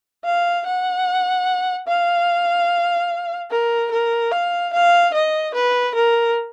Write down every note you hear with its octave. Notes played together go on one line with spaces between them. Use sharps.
F5
F#5
F5
A#4
A#4
F5
F5
D#5
B4
A#4